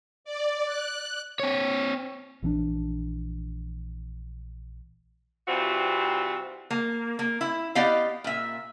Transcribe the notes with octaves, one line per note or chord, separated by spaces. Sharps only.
D5
F#6
C4 C#5
A#1 E3 C4 D4
C3 E3 G3 C4 F4 F#4
A#3
A#3
E4
B3 G4 D5 D#5 F5
A#2 E5